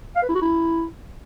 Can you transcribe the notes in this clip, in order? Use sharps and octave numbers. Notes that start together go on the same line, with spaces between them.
F5
B4
E4
F#4
E4